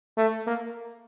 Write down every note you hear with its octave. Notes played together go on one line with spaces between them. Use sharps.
A3
A#3